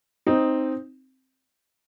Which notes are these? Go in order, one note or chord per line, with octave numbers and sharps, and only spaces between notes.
C4 D#4